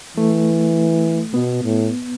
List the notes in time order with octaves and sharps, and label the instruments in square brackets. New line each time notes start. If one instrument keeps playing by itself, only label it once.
[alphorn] E3 [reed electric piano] A3
[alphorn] B2 [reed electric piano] B3
[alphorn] A2